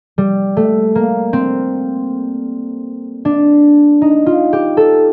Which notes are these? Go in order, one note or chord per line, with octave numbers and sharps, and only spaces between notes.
G3
A3
A#3
C4
D4
D#4
F4
G4
A4